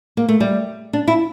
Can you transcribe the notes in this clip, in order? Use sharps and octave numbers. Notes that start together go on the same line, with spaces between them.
A#3
A3
G3
D4
E4